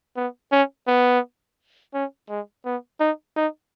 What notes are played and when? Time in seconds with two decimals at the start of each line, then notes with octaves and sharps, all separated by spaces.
0.16 B3
0.52 C#4
0.87 B3
1.94 C#4
2.29 G#3
2.65 B3
3.00 D#4
3.36 D#4